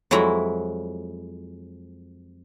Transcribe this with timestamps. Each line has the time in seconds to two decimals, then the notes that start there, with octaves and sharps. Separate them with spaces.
0.11 F2 F#3 G#3 E4 A#5